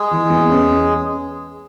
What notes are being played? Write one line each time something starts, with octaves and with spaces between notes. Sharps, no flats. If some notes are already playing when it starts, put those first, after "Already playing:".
Already playing: G#3 G#4
E3
E2
C#4